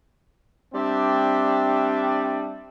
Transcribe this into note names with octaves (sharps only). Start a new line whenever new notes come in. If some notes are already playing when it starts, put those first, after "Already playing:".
G3 C4 D4 D5 E5 G5